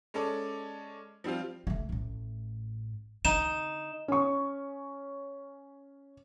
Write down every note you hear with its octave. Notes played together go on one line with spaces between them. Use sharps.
G#3 C#4 A4 D5
F3 G3 C4 F4
D3 A3
A1 A2
D3 D#4 E7
C#4 C#6